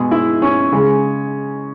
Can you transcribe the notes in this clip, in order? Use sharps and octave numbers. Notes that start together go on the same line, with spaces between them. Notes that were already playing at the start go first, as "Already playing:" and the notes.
Already playing: B2 G#3 G#4
E4
C#4
C#3 G#3